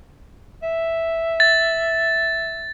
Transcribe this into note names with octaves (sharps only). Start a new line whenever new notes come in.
E5
A6